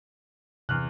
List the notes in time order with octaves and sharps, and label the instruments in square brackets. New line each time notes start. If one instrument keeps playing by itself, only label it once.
[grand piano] E2 F6 F#6 [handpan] C3